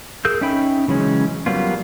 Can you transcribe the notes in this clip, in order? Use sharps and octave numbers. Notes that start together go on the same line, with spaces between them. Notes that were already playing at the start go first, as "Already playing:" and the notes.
G#4 A#4 E6 G6
C#4 D#4 E5 G5 B5
C#3 E3 F#3 G#3 C#4
F#3 G3 A#3 B3 F4